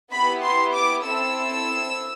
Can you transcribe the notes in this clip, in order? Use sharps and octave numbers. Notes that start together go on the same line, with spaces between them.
B3 E4 G4 B5
C6
D6
C4 E4 A4 E6